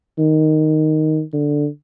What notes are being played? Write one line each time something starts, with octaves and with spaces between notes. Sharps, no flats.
D#3
D3